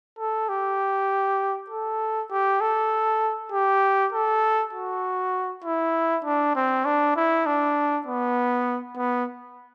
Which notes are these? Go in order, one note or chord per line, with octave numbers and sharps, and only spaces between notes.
A4
G4
A4
G4
A4
G4
A4
F#4
E4
D4
C4
D4
E4
D4
B3
B3